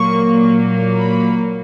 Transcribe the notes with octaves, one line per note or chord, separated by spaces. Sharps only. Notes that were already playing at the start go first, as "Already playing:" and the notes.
Already playing: A#2 F#3 A#3 C#6
B5